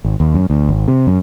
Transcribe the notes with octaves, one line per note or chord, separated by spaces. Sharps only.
G#1
D#2
F#2
D2
G#1
C3
F#2